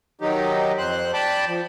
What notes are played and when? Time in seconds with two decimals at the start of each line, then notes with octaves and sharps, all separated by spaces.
0.21 D#3 F#3 D#4 G4
0.78 F2 C5 F#6
1.14 D5 G5 A5 B5
1.48 F3